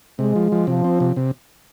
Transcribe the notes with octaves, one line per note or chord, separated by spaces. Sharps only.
C3 G#3
F3
F3
C3 F3
C4
C3
C3